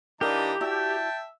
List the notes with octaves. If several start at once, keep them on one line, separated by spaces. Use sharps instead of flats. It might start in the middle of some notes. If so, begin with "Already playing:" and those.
E3 D4 D#4 G4 A#4 F5 A#5
E4 F#4 D5 E5 G5 A5